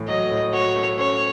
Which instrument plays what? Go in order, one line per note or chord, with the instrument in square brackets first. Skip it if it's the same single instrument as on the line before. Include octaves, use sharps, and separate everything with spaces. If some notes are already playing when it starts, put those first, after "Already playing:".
Already playing: [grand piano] A2 E3 A3
[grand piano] F#3 [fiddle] D#5
[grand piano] A2
[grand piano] F#4 [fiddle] C#5
[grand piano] A3
[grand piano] C#4 [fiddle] C#5